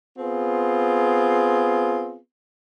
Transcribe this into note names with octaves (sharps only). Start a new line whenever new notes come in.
B3 C4 F4 G#4